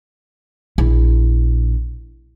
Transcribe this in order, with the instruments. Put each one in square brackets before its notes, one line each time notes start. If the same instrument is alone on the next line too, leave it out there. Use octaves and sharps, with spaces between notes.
[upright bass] A#1 E4